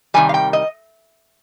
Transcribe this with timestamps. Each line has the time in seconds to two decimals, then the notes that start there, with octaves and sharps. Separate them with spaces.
0.14 C3 D#3 G3 G#5
0.29 F5
0.34 G5
0.53 D#5